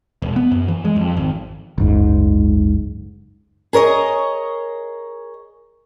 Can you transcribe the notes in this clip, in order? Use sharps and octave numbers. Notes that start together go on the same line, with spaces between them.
E1
B3
F#2
E3
G#3
F2
G#1
F#1 C#2 G#2
G#4 A#4 C#5 D#5